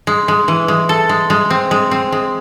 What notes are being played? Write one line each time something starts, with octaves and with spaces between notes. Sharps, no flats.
G#3
G#3
E3
G#3
A4
G#3
G#3
C4
G#3
C4
G#3